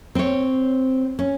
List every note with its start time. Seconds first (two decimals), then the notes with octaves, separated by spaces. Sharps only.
0.15 C4 C#5
1.19 C#4